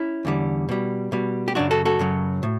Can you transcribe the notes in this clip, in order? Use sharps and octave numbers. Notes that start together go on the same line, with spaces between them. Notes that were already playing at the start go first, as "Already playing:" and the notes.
Already playing: C#4 E4
E2 D3 G3
B2 G3
B2 G3
G4
F#2 C#3 F#3 D4 F#4
F#4 A4
F#4 A4
F#2 C#3 F#3
A2